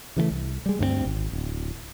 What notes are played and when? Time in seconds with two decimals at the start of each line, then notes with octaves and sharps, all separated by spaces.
0.16 C#3 E3 F#3 A3
0.31 C2
0.66 G3 G#3
0.79 D2 G2 A3 C4
1.06 G#1
1.33 D1